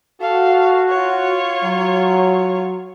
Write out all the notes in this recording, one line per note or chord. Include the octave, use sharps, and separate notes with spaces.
F#4 A4 F5
F4 C#5
F#3